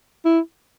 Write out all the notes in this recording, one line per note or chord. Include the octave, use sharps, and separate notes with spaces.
E4